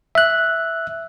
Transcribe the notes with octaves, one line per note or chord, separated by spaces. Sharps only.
E5 F#6